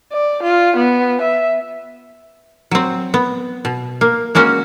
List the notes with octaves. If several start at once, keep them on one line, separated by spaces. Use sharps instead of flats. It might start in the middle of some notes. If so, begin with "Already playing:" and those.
D5
F4
B3
E5
F#3 C4
B3
B2
A#3
G#3 A#3 C#4 F#4